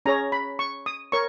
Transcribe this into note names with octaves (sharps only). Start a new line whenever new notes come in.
C#4 G#4 C#5 A#5
B5
C#6
D#6
A#4 C#5 C#6